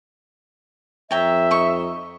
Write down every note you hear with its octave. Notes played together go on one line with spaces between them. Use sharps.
F2 C#5 E5 G5 A#5
D#4 C#6